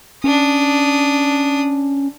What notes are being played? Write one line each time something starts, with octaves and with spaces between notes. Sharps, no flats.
C#4 D4 D#6